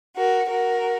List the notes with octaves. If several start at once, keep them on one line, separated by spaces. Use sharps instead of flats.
F#4 A#4
F#4 A#4